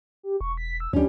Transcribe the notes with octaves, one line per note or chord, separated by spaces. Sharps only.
G4
E1 C#6
B6
E6
D2 G3 C#4 D4